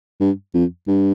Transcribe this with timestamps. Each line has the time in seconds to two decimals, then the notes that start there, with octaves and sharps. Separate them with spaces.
0.20 G2
0.54 F2
0.87 G2